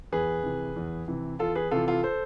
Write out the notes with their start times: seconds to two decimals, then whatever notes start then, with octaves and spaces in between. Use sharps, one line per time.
0.12 E2 G#4 B4
0.44 C3 E3
0.76 E2
1.08 C3 E3
1.39 E2 F4 A4
1.55 G#4 B4
1.71 C3 E3 F4 A4
1.87 F4 A4
2.03 A4 C5